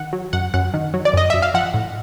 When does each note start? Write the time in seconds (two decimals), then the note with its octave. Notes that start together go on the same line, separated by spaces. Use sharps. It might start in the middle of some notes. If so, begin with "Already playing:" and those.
Already playing: D#3 F#5
0.13 F#3
0.33 F#2 F#5
0.54 F#2 F#5
0.74 D#3
0.94 F#3
1.05 D5
1.13 F#2 D#5
1.30 F#2 E5
1.42 F5
1.54 F3 F#5
1.74 A2